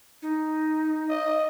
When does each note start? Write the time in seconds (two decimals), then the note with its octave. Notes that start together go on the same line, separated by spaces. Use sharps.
0.22 D#4
1.09 D#5